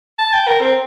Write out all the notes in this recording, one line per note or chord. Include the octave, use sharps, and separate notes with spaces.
A5
G5
A#4
C4